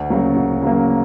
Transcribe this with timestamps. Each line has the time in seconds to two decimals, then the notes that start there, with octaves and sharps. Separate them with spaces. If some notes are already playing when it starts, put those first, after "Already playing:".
Already playing: D2
0.10 C#3 F#3 A#3
0.36 D2
0.62 C#3 F#3 A#3